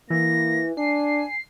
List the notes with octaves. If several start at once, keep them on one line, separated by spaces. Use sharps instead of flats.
E3 A#3 A#6
D4 G#5 C7